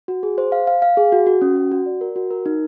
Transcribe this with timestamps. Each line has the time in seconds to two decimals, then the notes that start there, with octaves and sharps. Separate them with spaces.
0.08 F#4
0.23 G#4
0.38 C5
0.52 F5
0.67 F5
0.82 F5
0.97 G#4
1.12 F#4
1.27 F#4
1.42 C#4
1.56 F#4
1.71 F#4
1.86 D5
2.01 A#4
2.16 F#4
2.31 A#4
2.46 D#4